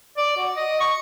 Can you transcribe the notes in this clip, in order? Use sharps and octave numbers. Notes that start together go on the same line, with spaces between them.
D5
F#4
D#5
C#6